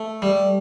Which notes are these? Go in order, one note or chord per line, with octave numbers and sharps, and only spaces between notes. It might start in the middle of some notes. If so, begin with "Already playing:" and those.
Already playing: A3
G3